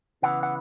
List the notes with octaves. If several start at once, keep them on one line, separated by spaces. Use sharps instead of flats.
C#3 E3 B3 E4 F#5
F#5